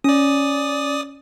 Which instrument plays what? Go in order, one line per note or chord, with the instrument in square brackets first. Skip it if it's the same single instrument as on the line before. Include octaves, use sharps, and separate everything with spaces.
[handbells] C#4 [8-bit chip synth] D5 D#6